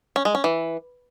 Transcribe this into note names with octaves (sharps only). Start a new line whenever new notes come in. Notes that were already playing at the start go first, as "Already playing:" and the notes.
C#4
G#3
C#4
E3